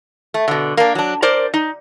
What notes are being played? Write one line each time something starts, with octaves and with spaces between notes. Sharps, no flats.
A3
B2 D3
A#3 D4
F#3 D4
A#4 C5 D5
D#4